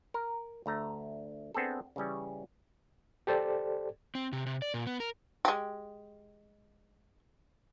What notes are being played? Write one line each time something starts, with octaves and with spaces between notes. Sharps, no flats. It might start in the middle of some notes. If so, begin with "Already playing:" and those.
A#4
D2 A3 A#5
B3 C4 D4 G#4 A4
C#3 E3 G3 C#4
G4 A4 C5 D5
C4
C3
C3
D5
A#2
B3
A#4
G#3 G4